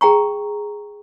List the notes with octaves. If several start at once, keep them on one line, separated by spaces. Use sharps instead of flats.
G#4 G5 A#5 C#6